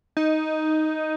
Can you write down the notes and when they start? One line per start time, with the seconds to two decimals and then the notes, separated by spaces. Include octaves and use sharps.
0.17 D#4